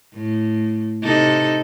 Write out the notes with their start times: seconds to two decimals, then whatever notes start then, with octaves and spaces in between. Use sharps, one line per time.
0.13 A2
1.03 C3 D#4 A4